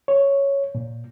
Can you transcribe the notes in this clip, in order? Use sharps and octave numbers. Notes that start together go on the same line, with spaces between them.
C#5
A#2